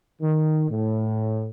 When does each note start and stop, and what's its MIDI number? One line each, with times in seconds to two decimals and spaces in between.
0.21 0.66 51
0.70 1.48 45